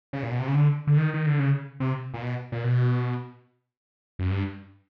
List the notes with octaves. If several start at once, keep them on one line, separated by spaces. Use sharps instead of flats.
C#3
A#2
B2
C3
C#3
D3
D3
D#3
D#3
D3
C#3
C3
A#2
B2
A#2
B2
F#2
G2